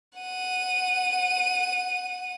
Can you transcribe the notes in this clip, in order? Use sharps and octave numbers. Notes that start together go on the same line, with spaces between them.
F#5 D#7